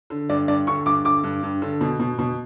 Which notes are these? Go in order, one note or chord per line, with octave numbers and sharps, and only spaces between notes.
D3
G2 D5
G2 D5
D3 C#6
G2 D6
D3 D6
G2
G2
D3
B2
B2
B2